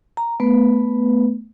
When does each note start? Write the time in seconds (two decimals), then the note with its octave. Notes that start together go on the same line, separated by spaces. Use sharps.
0.17 A#5
0.40 A3 B3 B4